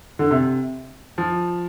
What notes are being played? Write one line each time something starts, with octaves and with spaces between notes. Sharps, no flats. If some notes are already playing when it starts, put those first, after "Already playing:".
D3
C3
F3